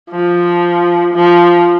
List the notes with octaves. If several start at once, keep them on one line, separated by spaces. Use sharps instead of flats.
F3
F3